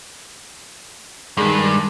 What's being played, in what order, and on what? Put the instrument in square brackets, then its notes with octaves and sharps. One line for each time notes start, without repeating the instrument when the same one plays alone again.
[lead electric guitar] G2 [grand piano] D#3 G#3